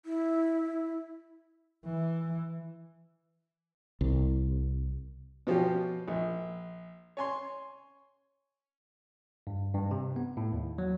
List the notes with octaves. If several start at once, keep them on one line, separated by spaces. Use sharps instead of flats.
E4
E3
C2
B2 F3 C#4 G4
A#1
C#5 G#5 C6
G2
G2
C3
B3
A2
D#2
F#3